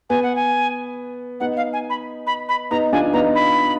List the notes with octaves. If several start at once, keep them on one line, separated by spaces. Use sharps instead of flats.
B3 G#5
F#5
G#5
B3 D#4 F#5
F5
G#5
B5
B5
B5
B3 D#4 A#5
D4 F4 G#5
B3 D#4 A#5
B5